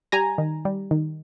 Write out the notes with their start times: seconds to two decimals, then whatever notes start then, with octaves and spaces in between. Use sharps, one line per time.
0.12 G3 G#5 A#5
0.38 D#3
0.65 G3
0.91 D#3